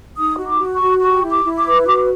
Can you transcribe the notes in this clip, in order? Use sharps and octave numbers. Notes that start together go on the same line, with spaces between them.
D#4 D#6
F#4
D6
F#4
C#6
F#4
G4 C#6
E4
D6
E4
D6
B4
F#4 D6